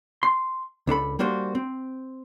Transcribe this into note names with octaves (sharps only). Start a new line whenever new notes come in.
C6
C#2 D4 A4 B5
G3 A#3 D4 F#4 C5
C4